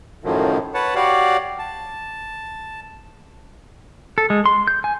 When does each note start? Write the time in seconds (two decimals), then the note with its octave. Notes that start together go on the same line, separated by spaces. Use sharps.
0.24 F#2 A2 D#3 F3 F#3
0.74 B4 C#5 F#5 A5
0.95 F#4 G4 C#5 D5 F5 F#5
1.59 A5
4.18 A4
4.30 G#3
4.46 C6
4.68 G6
4.84 G#5